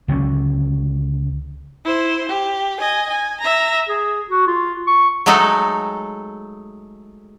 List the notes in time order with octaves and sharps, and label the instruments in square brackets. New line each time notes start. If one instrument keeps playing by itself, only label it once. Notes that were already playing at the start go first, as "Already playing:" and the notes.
[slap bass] C#2 D3 F#3 C#4
[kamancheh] E4 C5
G4
D#5 G#5
G#5
E5 A#5
[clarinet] G#4
F#4
F4
C#6
[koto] F#3 G#3 A3 D#4 A4 D#5